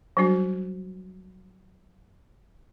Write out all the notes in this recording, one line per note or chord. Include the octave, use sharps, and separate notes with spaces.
F#3 G3 D4 F#4